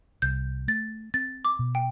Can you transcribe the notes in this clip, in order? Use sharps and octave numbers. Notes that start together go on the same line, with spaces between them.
C2 G6
A3 A6
C4 A6
D6
B2
G5